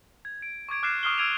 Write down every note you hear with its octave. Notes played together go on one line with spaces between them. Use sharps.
G#6
D7
C#6 D6 G#6 D7
D6 F6 F#6 A6 C7 E7
C#6 D#6 F6 C7 G7
E6 F6 G#6 D7 D#7 F7